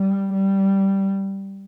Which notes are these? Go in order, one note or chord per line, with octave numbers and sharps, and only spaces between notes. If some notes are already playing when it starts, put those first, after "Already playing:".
Already playing: G3
G3